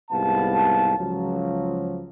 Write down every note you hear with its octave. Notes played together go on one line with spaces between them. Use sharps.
C2 G#2 B3 F5 A5
C#2 F3 F#3